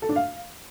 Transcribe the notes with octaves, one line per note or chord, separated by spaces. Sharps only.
A4
D4
F5